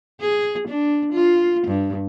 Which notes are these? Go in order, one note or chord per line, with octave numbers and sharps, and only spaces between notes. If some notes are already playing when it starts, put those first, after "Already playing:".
G#4
D4
F4
G2